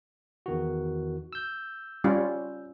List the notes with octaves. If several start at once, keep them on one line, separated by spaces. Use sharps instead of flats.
E2 D#3 F#4
E6 G6
G3 C#4 F4